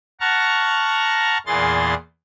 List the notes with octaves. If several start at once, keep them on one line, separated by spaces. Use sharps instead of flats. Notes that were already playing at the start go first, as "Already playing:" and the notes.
F#5 A5 A#5 C#6 F6
E2 A#2 E3 G#4 C6 A6